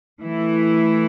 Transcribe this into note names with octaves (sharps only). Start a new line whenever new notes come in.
E3 A3 E4